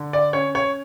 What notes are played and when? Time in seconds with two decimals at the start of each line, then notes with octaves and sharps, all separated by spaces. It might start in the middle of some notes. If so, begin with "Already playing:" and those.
Already playing: D3
0.13 D5
0.33 C#4 C#5
0.55 C#5